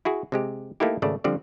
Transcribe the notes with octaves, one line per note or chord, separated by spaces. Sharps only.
E4 F#4 G#4
C3 G#3 G4
A3 A#3 D#4 E4 G4
G#1 C#3 A3 D5
D3 F3 G3 C4 D5